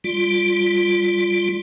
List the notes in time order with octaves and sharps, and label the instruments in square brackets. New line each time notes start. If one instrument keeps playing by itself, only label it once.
[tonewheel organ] G3 F4